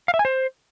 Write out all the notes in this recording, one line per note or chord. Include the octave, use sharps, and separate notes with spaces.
F5
E5
G#5
C5